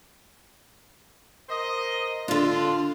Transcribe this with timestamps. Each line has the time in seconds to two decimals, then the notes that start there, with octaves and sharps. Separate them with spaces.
1.49 A#4 C5 D#5
2.28 D3 D4 F4